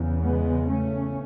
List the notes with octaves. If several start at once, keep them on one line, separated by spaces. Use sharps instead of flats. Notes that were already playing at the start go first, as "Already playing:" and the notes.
Already playing: E2 C#3
G#3 B3
A3 C#4